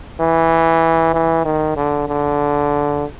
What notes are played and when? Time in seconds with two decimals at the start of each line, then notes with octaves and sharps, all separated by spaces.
0.21 E3
1.14 E3
1.45 D#3
1.76 D3
2.08 D3